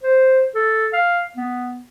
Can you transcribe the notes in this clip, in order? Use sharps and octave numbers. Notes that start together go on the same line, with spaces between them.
C5
A4
F5
B3